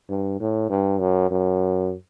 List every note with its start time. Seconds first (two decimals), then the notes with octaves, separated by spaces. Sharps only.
0.10 G2
0.40 A2
0.70 G2
1.00 F#2
1.31 F#2